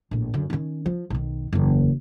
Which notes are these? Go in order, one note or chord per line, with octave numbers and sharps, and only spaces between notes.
A#1 A2
F#2 D3
D#3 C#4
F3
B1 D#3
F#1 E2